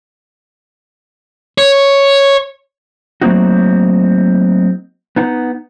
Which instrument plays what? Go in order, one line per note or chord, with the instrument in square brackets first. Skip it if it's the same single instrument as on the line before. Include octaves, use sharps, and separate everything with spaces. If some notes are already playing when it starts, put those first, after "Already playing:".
[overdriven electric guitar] C#5
[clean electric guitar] F#3 A3 A#3 C4 D#4 F#4
B3 D#4 F#5